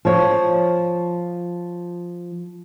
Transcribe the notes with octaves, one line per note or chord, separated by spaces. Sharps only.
F3 C#5